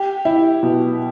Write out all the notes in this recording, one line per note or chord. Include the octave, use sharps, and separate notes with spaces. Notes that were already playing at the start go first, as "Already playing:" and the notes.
Already playing: G4
E4
B2